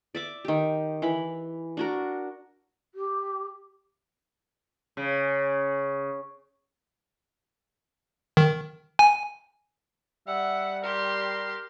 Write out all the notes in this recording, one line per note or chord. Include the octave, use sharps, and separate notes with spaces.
D5 E5 D6
D#3 G4
E3 B5
D4 F#4 A#4
G4
C#3
D#3
G#5
G3 E5 F#5
G4 A#4 C6